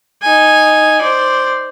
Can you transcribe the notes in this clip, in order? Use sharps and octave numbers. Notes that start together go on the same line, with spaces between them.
D#4 G#5
C5 D5